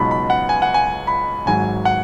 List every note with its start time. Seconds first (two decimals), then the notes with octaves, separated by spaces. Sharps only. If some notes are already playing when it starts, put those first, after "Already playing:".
Already playing: C#2 B2 F#3 D#4 B5
0.11 B5
0.30 F#5
0.49 G#5
0.62 F#5
0.74 G#5
1.07 B5
1.46 G#1 G#2 F#3 G#5
1.85 F#5